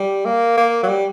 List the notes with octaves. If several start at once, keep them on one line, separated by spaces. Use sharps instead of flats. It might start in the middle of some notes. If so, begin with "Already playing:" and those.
Already playing: G3
A#3
A#3
F#3
G3